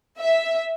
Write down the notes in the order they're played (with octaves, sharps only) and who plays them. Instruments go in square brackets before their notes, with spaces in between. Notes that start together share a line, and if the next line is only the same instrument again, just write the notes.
[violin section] E5